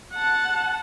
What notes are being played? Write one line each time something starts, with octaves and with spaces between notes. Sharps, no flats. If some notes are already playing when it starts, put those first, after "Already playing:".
F#5 A5